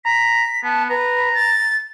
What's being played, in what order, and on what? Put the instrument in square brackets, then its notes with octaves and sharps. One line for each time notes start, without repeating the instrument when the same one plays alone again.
[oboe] A#5 [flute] B6
[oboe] B3 [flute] A5
[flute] B4 [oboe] A#5
[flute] A6